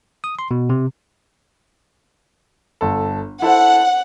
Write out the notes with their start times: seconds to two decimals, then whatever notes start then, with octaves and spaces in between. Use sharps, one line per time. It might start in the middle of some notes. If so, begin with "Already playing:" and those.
0.24 D#6
0.39 C6
0.51 B2
0.70 C3
2.81 G1 A4
3.42 E4 A4 C5 F#5